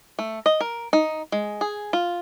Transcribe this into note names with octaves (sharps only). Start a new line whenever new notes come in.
A3
D#5
A#4
D#4
G#3
G#4
F4